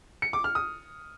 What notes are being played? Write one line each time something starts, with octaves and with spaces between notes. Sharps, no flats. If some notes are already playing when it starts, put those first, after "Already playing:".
C#7
D6
F6
D#6